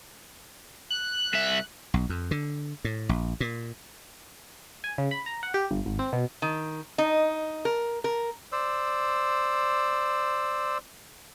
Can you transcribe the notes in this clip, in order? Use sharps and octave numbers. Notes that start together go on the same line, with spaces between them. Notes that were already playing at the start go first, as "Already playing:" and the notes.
F#6
C2 E5
B1
F2
D3
A2
A#1
A#2
G#5
C#3
B5
A#5
F#5
G4
G1
G#1
C4
B2
D#3
D#4
A#4
A#4
C5 D5 E6